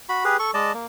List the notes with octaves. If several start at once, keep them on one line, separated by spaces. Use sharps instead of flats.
F#4 B5
G4 G#4 B4
A4 C#6
G#3 D5 D#5 A5
A#3